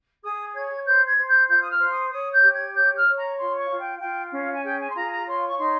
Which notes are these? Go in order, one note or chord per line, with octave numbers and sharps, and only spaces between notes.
G#4 D#6
C#5 G#6
C5 G6
G#6
C5
G6
F4 G6
D#6
F6
C5
D#6
C#5 D#6
G6
G4
G#6
C#5 G6
F6
C#5
A#5
F4 C6
C#6
F4
G5
F4 G5
C#4 F5
G#5
G#4 G5
G#5
C6
F4 A#5
A#5
C#5 C6
C#6
D#4 C6